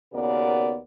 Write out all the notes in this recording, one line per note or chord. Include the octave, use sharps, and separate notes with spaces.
D#2 C#3 B3 F#4 A#4 D5